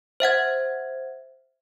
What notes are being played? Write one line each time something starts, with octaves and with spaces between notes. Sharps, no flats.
C5 E5 F#5 G#6